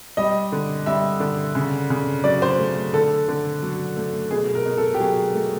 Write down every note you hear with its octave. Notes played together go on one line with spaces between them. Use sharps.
G3 D#5
D3
G3 E5
D3
C#3
C#3
F#3 D5
C5
A3
D3 A4
D3
F#3
A3
B2 G#4
A#4
B2
A4
G4
F#3 G#4
A3